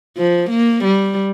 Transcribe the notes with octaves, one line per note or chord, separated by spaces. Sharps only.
F3
A#3
G3